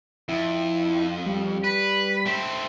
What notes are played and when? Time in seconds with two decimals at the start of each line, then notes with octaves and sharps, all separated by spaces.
0.29 F2 E4
1.26 G3
1.64 B4 B5
2.26 A3 C4